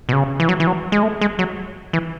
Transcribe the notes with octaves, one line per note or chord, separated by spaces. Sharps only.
B2
C#3
E3
F#3
E3
F#3
G#3
A3
G#3
F#3
E3